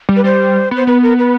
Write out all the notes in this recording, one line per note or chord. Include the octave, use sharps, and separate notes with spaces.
G3
B4
G3 C5
B3
C5
B3 B4
A#4
B4